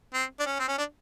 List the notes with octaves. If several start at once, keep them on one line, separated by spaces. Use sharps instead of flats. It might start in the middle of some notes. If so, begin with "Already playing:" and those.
C4
D4
C#4
C4
C#4
D4